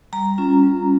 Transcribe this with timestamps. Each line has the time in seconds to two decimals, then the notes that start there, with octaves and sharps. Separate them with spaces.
0.13 G3 A#5
0.38 C#4 F4
0.63 G3